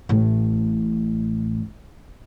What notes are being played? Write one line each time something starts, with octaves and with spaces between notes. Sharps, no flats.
A1 A2